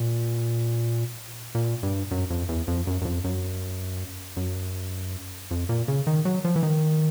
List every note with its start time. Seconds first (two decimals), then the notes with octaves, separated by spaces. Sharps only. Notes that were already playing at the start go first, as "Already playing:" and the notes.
Already playing: A#2
1.55 A#2
1.83 G2
2.11 F#2
2.30 F2
2.49 E2
2.68 F2
2.87 F#2
3.01 F#2
3.05 F2
3.24 F#2
4.37 F#2
5.51 F2
5.69 A#2
5.88 C#3
6.07 D#3
6.25 F#3
6.45 F3
6.56 E3
6.63 D#3